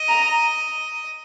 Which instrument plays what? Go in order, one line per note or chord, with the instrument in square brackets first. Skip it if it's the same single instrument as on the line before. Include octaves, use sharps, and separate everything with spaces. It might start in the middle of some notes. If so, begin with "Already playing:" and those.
Already playing: [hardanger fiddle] D#5
[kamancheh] A#5